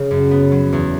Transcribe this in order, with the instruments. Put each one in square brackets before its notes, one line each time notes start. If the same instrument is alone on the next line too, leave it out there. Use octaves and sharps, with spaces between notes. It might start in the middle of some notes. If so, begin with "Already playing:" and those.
Already playing: [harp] C#3
F#2
B3
F#3
E2